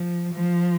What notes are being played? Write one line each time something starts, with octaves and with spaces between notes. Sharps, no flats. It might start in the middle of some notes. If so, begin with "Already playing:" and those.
Already playing: F3
F3